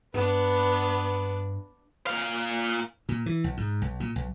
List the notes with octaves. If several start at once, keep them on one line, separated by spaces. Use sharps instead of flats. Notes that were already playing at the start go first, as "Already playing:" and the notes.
G2 B3 D4 B4
A#2 F5
A#2
E3
B1
G#2
B1
A#2
B1